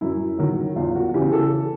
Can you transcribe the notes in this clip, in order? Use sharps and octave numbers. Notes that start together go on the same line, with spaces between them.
F#2 E4
D#3 F#3
E2 F4
F#4
C#3 E3 G4
A4